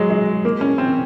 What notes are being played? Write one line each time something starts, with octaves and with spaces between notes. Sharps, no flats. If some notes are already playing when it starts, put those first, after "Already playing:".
Already playing: F#3 G#3
G#3
A#3
C#4
C4